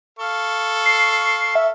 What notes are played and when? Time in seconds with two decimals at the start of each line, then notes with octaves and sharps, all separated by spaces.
0.19 A4 F5 C#6
0.86 C7
1.55 E5